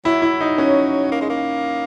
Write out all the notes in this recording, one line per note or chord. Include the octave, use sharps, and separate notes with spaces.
F#3 E4
E4
D#4
F#3 C#4
A#3
G#3
A#3